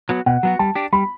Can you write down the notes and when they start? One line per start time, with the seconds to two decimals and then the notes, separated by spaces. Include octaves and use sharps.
0.09 F#3 B3 F#4
0.26 B2 F#5
0.43 F#3 B3 F#4
0.59 G3 A5
0.75 D4 G4
0.93 G3 B5